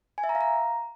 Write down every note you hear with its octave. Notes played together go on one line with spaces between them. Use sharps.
G#5
E5
A#5
F5
A#5